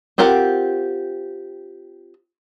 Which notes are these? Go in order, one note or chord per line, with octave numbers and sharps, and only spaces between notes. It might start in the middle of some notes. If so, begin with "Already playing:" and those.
C4 F4 G4 A#4 F#5